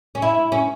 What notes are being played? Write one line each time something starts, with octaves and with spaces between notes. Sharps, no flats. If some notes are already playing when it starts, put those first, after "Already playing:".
C#4
E4
C#4